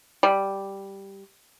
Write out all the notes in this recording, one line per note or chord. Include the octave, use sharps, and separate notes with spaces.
G3